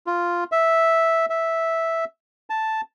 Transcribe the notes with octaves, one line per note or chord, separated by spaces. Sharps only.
F4
E5
E5
A5